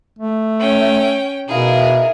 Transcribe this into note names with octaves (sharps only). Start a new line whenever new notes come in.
A3
C#4 G5
B2 D#4 E4 G#4 A#4 F5